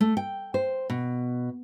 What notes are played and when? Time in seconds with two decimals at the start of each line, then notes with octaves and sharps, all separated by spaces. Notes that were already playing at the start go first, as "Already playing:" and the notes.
0.01 A3
0.17 G5
0.54 C5
0.90 B2